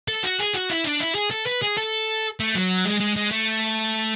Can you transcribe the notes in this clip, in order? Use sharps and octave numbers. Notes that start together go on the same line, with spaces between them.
A4
F#4
G#4
F#4
E4
D4
E4
G#4
A4
B4
G#4
A4
A3
F#3
G#3
G#3
G#3
A3